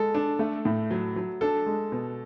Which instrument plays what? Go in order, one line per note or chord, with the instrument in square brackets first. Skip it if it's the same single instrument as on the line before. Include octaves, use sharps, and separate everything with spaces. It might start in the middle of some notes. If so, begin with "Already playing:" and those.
Already playing: [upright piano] G#3 [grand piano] A4
[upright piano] D4
A3
A2
F#3
F#3
[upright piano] D4 [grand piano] A4
[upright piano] G#3
B2